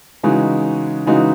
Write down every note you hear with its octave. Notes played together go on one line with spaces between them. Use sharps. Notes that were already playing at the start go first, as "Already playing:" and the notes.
C#3 E3 G#3 D#4 F#4
C#3 E3 G#3 D#4 F#4